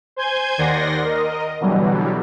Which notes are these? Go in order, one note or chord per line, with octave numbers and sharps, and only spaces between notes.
C5 G#5 G6 G#6
D#2 D#3 D5 F#5 C6 A#6
A#4 D#5
B2 D3 E3 F#3 G3